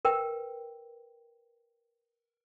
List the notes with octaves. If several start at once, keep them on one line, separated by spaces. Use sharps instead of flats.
A#4 B4 G5